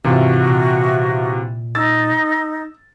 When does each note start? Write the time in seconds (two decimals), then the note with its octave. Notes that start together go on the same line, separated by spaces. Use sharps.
0.04 G#2 C3 E3 F4 F#4
0.49 A#2
1.75 D#4 E6 A6